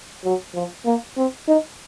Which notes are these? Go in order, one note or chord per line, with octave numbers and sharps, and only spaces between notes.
F#3
F3
A#3
C4
D#4